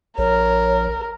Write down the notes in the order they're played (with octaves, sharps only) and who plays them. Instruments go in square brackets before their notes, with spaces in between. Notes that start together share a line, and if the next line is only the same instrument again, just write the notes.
[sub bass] A#1 [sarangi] A#4 [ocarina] C#5